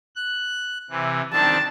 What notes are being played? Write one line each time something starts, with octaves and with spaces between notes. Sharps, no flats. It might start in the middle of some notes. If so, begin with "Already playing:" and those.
F#6
C3 E3
D#3 C4 D4 A5